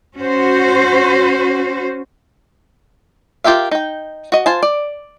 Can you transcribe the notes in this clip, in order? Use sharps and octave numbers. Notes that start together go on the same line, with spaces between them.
C#4 F#4 C5
F4 G4 A#4 E5 F5
D#4 G5
F#4 D#5
F4 C5 G#5 A5
D5